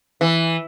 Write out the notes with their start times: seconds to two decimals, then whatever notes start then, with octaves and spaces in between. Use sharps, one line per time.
0.21 E3